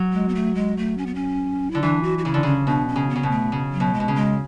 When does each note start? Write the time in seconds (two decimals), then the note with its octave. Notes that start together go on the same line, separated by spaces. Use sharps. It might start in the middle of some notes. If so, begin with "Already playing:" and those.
Already playing: F#3
0.13 G#3
0.28 B3
0.35 A3
0.55 G#3
0.77 A3
0.98 C#4
1.06 B3
1.15 C#4
1.71 D3 E4
1.82 E3 D4
2.03 F#4
2.18 F#4
2.25 C#3 E4
2.34 D3
2.43 C#3 C#4
2.67 B2 D4
2.88 C#4
2.96 C#3
3.10 B3
3.15 C#3
3.23 B2
3.31 A3
3.52 C#3
3.73 F#3
3.80 B2
3.94 G#3
4.00 B2
4.08 C#3
4.15 G#3